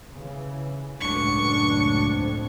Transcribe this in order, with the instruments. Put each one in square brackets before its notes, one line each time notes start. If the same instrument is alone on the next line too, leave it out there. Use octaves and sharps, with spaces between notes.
[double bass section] C#3 E3
[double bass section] C#2 F#2 A2 [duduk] D4 [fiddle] C#6
[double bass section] F2 A2